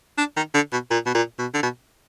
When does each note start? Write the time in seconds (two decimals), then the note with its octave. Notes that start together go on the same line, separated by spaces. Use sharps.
0.18 D4
0.36 D#3
0.54 D3
0.72 B2
0.91 A#2
1.06 B2
1.15 A#2
1.39 B2
1.54 D3
1.63 B2